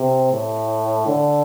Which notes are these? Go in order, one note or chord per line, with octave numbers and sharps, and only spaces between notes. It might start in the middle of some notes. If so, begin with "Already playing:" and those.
Already playing: C3
A2
D3